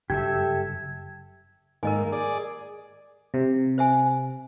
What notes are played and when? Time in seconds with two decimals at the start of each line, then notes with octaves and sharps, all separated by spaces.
0.10 F#1 G2 G4 A4 E5 G#6
1.83 G#2 D#3 A#3 A#4 D#5 G#5
2.12 G#4 D5
3.34 C3
3.78 C5 E5 G#5